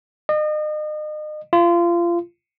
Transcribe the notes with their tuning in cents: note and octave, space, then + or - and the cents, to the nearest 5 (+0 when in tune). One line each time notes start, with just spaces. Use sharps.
D#5 -35
F4 -25